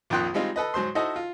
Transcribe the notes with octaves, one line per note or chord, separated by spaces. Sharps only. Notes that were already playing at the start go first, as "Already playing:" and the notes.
A#1 F2 D#3 G5 C6 F#6
G3 G#3 C4 D#4 F4
A4 B4 D#5
G#2 F#3 C5 C6
D#4 E4 F#4 A4 C5 D#5
F4